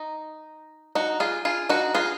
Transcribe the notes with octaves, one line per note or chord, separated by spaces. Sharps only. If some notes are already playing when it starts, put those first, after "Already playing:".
Already playing: D#4
D#4 F#4
F4 G#4
F4 G#4
D#4 F#4
F4 G#4